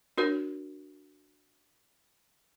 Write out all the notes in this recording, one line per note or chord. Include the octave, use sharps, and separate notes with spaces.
D4 F#4 A#4 C#5